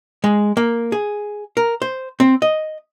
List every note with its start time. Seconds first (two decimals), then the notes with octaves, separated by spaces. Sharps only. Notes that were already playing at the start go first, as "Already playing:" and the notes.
0.24 G#3
0.57 A#3
0.92 G#4
1.57 A#4
1.82 C5
2.20 C4
2.42 D#5